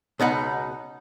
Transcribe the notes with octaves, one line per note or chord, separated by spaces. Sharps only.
C#2 B2 D#4 F#5